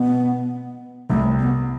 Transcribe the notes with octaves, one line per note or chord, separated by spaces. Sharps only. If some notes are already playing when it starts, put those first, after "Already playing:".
Already playing: B2 B3
C2 C3 A3
B3